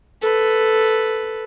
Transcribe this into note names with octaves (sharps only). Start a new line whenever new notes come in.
A4 B4